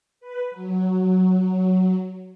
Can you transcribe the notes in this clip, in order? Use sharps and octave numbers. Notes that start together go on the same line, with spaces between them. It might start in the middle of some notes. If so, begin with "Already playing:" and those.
B4
F#3